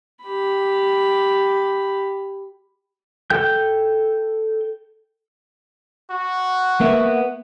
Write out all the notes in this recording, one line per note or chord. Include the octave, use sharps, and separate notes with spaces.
G4 B5
A4 G5 G6
F#4
A#3 B3 E5